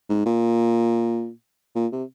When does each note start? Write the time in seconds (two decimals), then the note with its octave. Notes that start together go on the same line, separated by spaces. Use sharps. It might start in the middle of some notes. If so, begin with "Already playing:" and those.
0.09 G#2
0.25 A#2
1.75 A#2
1.92 C3